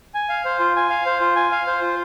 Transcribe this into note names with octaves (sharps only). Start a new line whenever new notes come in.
G#5
F5
C5
F4
G#5
F5
C5
F4
G#5
F5
C5
F4